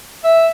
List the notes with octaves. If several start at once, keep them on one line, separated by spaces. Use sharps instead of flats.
E5